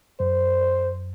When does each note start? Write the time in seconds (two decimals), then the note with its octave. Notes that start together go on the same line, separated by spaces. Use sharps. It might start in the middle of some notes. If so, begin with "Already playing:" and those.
0.20 F#2 C5